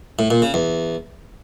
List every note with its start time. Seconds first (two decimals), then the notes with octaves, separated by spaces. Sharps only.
0.19 A2
0.31 A#2
0.42 C#3
0.54 E2